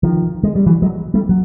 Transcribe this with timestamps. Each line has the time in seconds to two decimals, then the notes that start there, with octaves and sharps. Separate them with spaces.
0.03 D#3 F3
0.43 G#3
0.56 G3
0.66 E3 F#3
0.82 F#3 G#3
1.14 G3 A3
1.29 F#3